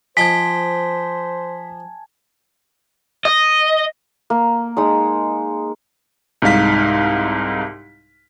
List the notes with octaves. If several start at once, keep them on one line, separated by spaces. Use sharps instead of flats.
F3 C5 D#5 G#5 A5 G#6 B6
D#5
A#3
G#3 D#4 D#6
C2 G#2 D#4 F5 B6